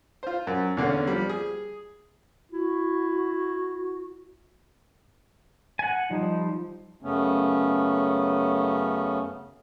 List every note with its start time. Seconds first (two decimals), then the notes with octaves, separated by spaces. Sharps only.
0.23 F4 C5
0.47 F#2
0.77 E2 D3 A#3 C#4
1.07 F3 G3
1.29 G#4
2.51 E4 F#4
5.79 F#5 G#5
6.11 F3 G3 D#4
7.02 F#2 C#3 A3 B3 C#4